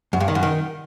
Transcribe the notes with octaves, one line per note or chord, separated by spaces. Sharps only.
F#2
G2
D#3
F#2
D#3